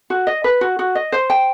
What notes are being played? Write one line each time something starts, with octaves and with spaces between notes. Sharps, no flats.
F#4
D#5
B4
F#4
F#4
D#5
C5
G5